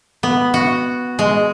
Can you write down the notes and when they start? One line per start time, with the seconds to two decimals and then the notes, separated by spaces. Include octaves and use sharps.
0.23 B3
0.54 F#4
1.19 G#3